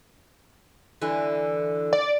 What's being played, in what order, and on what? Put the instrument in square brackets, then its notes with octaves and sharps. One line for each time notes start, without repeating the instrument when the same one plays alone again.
[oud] D3 E3
[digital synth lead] D5